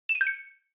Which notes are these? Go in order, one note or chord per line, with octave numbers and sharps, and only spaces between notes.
E7
D#7
G6
C#7